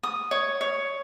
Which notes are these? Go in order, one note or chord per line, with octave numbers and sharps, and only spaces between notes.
D#6
C#5
C#5